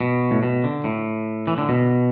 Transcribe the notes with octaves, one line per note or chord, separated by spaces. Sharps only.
B2
A2
B2
D3
A2
E3
D3
B2